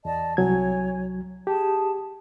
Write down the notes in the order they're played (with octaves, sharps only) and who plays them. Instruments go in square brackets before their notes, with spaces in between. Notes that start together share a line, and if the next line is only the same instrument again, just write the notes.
[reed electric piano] E2 [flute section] D5 D#5 A5
[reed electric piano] C2 F#3 G#6 [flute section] C#5 G#5
[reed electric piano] G4 [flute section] G#4 A5